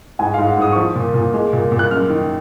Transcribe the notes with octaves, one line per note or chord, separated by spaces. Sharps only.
G#2 G#5
G#2 F5
F#5
G#2 D#6
C#6
F3 D#6
A#2
A#2
G#3
A#2
A#2
F#6
F#2 F6
D#3